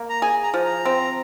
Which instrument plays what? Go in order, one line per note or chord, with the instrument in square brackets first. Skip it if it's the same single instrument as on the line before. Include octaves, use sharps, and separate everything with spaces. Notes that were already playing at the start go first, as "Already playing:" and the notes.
Already playing: [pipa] A#3
[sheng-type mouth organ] A#5
[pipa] G#4 [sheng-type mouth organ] G#5
[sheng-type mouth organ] A#5
[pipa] F3
[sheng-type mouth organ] A#5
[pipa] C4